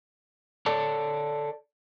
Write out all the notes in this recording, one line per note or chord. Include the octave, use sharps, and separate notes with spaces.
A4 C#5 D5 A5